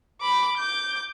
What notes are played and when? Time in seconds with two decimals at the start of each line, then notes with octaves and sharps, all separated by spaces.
0.21 B5 D6
0.57 D6 G6